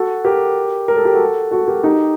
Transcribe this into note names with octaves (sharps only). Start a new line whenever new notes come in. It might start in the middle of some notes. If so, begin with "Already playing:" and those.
Already playing: F#4 A4
G4 A#4
A#4
A4
G4
F#4 A4
F#4 A4
G4 A#4
D#4 G4